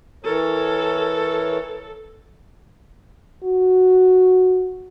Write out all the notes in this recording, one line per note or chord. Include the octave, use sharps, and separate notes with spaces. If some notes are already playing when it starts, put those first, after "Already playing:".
E3 A4 A#4 C#5
F#4